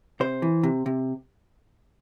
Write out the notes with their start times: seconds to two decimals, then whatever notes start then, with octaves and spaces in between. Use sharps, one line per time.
0.20 C3 C5
0.42 E3
0.63 C3
0.86 C3